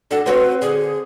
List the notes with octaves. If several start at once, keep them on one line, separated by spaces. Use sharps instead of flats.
D4 F#4 A4
C4 F#4 B4 C#5
D3 G#4